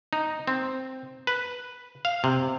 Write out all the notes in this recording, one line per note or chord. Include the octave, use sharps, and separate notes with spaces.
D#4
C4
B4
F5
C3